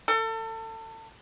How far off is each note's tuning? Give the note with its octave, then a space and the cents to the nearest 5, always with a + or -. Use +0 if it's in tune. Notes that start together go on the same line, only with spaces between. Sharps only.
A4 +30